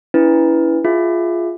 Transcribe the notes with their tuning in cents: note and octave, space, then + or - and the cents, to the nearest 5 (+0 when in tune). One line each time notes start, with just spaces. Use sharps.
C#4 +45 E4 +0 B4 +0
F4 +0 G#4 +0 E5 +0